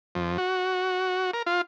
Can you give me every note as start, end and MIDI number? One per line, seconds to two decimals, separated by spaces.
0.15 0.38 41
0.38 1.31 66
1.34 1.42 70
1.46 1.61 65